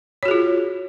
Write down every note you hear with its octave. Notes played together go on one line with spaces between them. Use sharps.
F4 F#4 G#4 C#5